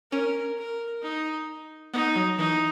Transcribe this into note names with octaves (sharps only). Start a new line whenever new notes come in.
C#4 A#4
A#4
D#4
B3 D#4
F#3
E3 D#4